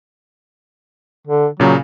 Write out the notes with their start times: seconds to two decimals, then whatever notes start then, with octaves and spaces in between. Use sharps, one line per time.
1.27 D3
1.60 A#2 C#3 F#3